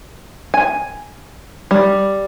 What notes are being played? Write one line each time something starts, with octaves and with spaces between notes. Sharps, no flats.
G#5
G3